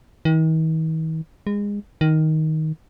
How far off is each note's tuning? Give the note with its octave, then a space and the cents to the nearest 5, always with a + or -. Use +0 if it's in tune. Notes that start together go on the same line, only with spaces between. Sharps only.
D#3 +45
G#3 -25
D#3 +10